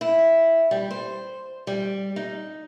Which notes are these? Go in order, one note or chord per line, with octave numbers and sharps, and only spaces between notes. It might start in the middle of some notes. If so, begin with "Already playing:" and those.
E4
G3
C5
G3
D#4